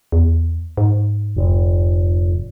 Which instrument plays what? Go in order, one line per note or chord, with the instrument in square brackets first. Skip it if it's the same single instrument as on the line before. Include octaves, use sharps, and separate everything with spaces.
[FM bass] E2
G#2
[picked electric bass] F1